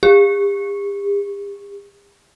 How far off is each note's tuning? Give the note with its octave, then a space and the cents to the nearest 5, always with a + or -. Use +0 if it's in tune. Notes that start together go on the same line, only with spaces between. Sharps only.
G4 +45